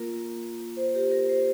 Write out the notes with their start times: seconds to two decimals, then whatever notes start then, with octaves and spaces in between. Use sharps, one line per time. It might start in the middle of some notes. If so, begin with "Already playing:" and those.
Already playing: A#3 F4 A#4
0.77 C5
0.95 G4
1.12 A#4
1.29 C5